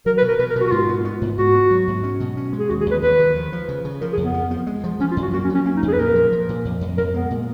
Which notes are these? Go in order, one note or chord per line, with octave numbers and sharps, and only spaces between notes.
F#3 A#4
B4
B2
A#4
B2 B4
A#4
B2 F#4
F#4
G#2 F4
B3
B3
G#2
G#2 F#4
B3
F#3
G#2
C#4
B2
C#4
G#3
G#4
D#2 F#4
G#4
D#2
B4
D#2 B4
D#3
F3
F3
C#3
C#3
F3 A#4
G#4
F2
B3
F3
F3
G#3
F3
F3 C#4
F4
F#2
F#4
A#3 F#4
C#4
F#3
C#4
A#3 C#4
D#4
F2
G#4
B4
A#2 A#4
F3
F3
A#2
F2
F2
F2 A#4
G#3 B3
A#2